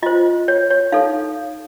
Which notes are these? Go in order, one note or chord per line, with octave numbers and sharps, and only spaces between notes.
F4 C5 D#5
C#5
C#5
D#4 A4 C#5 F5